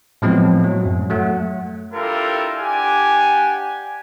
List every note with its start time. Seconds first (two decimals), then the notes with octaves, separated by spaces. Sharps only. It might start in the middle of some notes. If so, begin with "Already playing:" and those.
0.22 A2 F3 F#3 G#3 B3 C4
0.64 F#3
0.85 F#2
1.10 F#3 A3 F#5
1.93 D4 E4 F4 G4 A4 A#4
2.57 D4 G4 F#5 G#5